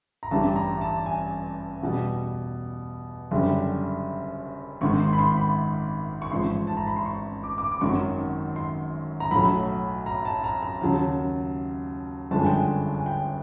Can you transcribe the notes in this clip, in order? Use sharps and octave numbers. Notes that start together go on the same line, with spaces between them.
A#5
A1 G2 E3 G3 A5
A#5
A5
G#5
E2 B2 G3
F#1 F#2 D3 G3
G#1 G#2 D#3 C#6
C6
B5
C6
B5
C#6
A1 G#2 F3 C6
A5
A#5
B5
C6
C#6
D6
D6
D6
G#1 F#2 D#3 F#3 C#6
C6
A#5
B1 A2 F#3 B5
A#5
A5
A#5
A#5
D#2 C#3 F#3 A5
G1 F#2 D3 F3 G#3 A5
G#5
G5
G#5
G#5
G5